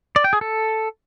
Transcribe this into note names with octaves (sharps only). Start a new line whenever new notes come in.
D5
G5
G#4
A4